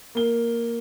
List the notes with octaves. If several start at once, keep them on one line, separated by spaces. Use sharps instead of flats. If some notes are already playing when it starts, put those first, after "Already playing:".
A#3 G7